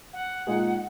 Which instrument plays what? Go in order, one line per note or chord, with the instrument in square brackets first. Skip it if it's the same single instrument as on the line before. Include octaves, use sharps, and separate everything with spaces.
[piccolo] F#5
[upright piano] A#2 G#3 D#4 G#4